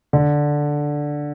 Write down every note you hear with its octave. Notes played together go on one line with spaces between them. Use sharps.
D3